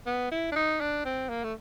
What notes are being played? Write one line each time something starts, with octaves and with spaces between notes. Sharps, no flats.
B3
E4
D4
D#4
D4
C4
A#3
A3